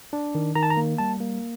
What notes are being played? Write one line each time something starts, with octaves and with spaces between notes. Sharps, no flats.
D4
D#3
D#3 A#5
A5
A#5
A#3
G3 A5
A#3